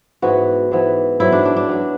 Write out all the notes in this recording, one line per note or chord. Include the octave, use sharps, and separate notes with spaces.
G#2 E3 B3 F#4
G#2 E3 B3
G#2 F#3 B3 E4
D4
D4
D4
F#3 B3